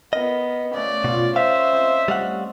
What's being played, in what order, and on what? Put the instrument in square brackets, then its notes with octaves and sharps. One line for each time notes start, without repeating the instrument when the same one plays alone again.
[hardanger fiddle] B3 [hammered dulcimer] A#4 [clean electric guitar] D#5
[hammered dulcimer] C#3 A3 [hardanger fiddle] D5
[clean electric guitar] B2 [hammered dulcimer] A3 F4
[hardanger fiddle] C5 [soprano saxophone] E5 [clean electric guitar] F5
[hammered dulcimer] C4 D#5
[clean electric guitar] G3 F5 F#5 [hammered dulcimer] A3